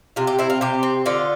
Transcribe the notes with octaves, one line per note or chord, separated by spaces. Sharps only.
C3 F4
G4
C4 E4
F4
C3 G4
C4
D3 F4